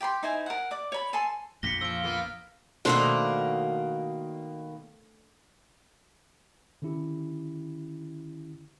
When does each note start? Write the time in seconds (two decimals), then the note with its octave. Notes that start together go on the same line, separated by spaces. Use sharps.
0.01 G4 G5 B5 C6
0.23 D#4 E4 C5 G#5
0.46 A#4 F#5
0.71 D5 D6
0.92 C#5 B5
1.13 A4 G#5 A5 C6
1.63 A#1 F2 A#6 B6 C#7 G7
1.81 F3 E6 D7
2.03 A#3 B3 F4
2.85 B2 D#3 A3 A#3 D4 C5
6.82 D3 D#3 C#4 E4 G4